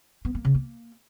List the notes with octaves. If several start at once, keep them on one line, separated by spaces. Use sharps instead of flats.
B3
A#3
C#3
A#3